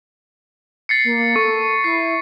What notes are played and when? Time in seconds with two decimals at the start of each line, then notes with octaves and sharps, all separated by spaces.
0.89 A6 C7 C#7
1.04 A#3
1.36 A4 C#6
1.84 E4 C7